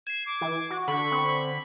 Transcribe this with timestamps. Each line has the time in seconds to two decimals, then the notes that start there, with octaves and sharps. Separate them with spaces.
0.07 G#6 C7 E7
0.26 D6
0.41 E3
0.70 F#4
0.88 D3 B5 C#6
1.12 C4